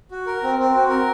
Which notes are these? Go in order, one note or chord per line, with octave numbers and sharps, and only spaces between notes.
F#4
A#4
C4
C4
F#4
A#4